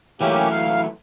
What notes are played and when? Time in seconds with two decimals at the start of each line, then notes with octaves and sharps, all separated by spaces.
0.21 E3 F#3 A3 A#3 C#4 G4
0.51 F5